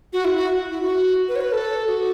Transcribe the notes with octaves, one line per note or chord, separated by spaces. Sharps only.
F#4
E4
F#4
E4
F#4
B4
C#5
B4
A4
F#4